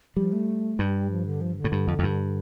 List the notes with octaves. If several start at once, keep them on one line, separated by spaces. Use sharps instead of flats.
F3 G3
A3
G2 G3
F3
D3
F3
D3
A2
G2
F2
F2
G2